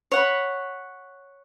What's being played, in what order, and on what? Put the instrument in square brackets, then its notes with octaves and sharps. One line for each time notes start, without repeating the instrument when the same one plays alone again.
[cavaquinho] C#5 F#5 B5